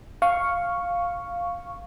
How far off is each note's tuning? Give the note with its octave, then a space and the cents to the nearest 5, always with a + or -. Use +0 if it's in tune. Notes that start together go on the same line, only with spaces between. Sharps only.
F5 +0 C#6 +0